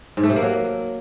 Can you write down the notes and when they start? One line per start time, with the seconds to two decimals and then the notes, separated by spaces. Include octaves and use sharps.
0.17 G#2
0.23 A3
0.30 C3
0.36 A#3
0.43 F#3